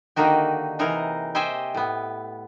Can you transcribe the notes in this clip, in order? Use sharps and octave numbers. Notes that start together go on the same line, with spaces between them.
D3 D#3 A#3 D#4 F#4 G4
C3 E3 D#4 G#4 A#4
G4 C5 D#5 E5 G5 G#5
A2 B3